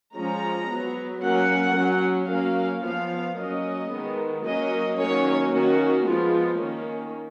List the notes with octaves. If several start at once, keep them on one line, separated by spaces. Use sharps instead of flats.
F3 G#3 C#4 A#5
F#3 B3
F#3 A#3 C#4 F#5
F#3 C#4
F#3 A#3 C#4 F5
F3 B3 F5
F#3 A#3 C#4 D#5
D#3 G#3 B3
F#3 A#3 C#4 D#5
D#3 F#3 A#3 C#4 C#5
D#3 A#3 C#4 F#4
F3 G#3 B3 F4
D#3 A#3 C#4